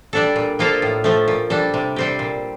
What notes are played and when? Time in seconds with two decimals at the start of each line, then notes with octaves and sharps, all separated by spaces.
0.13 G3 D4 A4
0.36 A#2
0.59 F3 A#3 F4 A4
0.82 A2
1.04 F3 A3
1.28 A#2
1.50 G3 D4 A4
1.74 C3
1.96 G3 C4 G4
2.19 A#2